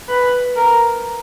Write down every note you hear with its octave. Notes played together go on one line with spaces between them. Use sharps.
B4
A#4